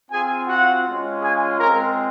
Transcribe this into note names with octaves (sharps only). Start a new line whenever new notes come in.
C4 F4 G#4 G#5
F#4 F#5
G#3 C#4 F4
G#4 G#5
G#3 C4 F4 A#4 A#5